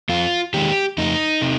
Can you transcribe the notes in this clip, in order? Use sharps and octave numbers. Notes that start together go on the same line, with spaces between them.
F2 F4
D#3 G#3 G4
F2 D#4
C3